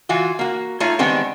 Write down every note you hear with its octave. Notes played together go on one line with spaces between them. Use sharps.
E3 F4 F#4
A#3 F#4
A3 D#4 F4 C#5
D#3 G3 G#3 B3 C4 D4